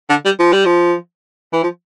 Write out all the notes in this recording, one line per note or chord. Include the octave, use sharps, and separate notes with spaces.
D3
G3
F3
G3
F3
E3
F3